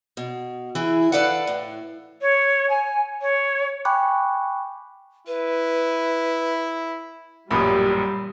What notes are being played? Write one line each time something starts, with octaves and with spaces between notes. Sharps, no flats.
B2
E3 E4 G#4
A4 B4 D5 F5 F#5
A2
C#5
G#5
C#5
G5 G#5 B5 C#6 D6 F#6
E4 B4
A1 F#2 A#2 G3 B5 D#6